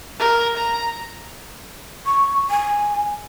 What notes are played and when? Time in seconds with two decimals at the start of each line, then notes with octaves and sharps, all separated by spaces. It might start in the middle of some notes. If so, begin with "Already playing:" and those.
0.19 A#4
0.57 A#5
2.06 C#6
2.50 G#5